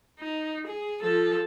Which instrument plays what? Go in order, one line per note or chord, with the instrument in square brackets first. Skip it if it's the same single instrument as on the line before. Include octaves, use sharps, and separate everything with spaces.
[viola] D#4
G#4
F3 A4